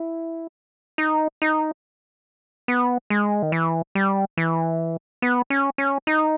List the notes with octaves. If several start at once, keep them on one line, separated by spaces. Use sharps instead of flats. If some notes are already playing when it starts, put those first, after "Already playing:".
Already playing: E4
D#4
D#4
B3
G#3
D#3
E3
G3
E3
B3
C#4
C#4
D#4